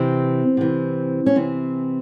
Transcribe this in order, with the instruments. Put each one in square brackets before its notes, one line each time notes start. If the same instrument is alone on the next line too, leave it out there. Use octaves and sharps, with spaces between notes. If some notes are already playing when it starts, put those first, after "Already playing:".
Already playing: [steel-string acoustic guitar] C3 E3 C4
C3 E3
C#4
C3 E3 C4